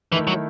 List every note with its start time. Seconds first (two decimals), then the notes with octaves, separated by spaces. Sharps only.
0.12 D#3 E3 A3 E4
0.27 F#3